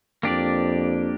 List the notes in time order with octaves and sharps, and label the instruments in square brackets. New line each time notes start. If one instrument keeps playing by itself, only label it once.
[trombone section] F2 [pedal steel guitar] A#3 D4 G4 D5